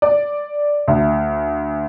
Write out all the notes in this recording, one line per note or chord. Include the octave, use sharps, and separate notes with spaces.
D5
D2